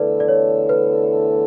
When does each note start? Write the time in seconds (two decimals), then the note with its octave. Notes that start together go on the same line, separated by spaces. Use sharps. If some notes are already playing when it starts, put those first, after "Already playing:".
Already playing: E2 D3 A3 E4 A4 B4 D5
0.20 D5
0.28 C#5
0.69 B4